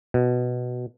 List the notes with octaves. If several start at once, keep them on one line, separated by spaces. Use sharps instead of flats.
B2